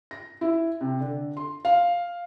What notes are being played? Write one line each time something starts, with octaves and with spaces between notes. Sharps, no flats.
A#6
E4
C3
D3
C6
F5